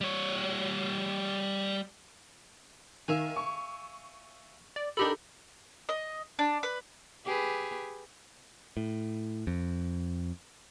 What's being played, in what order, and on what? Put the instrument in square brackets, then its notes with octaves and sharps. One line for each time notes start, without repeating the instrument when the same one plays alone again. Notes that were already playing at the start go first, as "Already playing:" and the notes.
[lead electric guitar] G3 C#5
[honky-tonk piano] D#3 [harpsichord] E5 F5 G#5
[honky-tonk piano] C#6
[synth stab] D5
[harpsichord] D4 A#4 B5 [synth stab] D#4 G4 A4
[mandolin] D#5
D4
B4
[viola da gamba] G4 G#4 B4
[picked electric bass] A2
F2